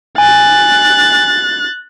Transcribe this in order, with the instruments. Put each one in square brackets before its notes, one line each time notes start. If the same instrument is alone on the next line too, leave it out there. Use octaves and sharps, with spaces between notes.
[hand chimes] G#5 [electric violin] F#6 A6